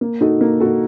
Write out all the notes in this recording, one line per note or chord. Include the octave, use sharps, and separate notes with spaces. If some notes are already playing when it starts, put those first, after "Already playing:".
A#3
D#4 F#4 A4
A#3
D#4 F#4 A4